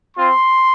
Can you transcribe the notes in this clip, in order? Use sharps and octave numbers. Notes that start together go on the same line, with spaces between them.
C4 F4 C6